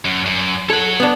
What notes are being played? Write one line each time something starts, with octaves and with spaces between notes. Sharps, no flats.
F#2
F#2
A4 C#5 F#5
B3 D4